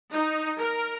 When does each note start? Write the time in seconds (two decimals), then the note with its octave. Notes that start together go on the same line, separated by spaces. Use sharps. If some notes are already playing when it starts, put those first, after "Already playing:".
0.13 D#4
0.59 A#4